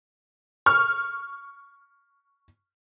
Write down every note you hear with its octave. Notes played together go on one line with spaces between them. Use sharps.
C#6 F6